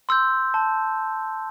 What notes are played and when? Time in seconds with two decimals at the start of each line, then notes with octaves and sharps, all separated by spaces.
0.09 C6 E6 G6
0.54 A5